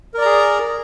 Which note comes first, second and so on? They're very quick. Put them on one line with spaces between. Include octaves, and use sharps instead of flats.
A#4 D5 A#5 G#4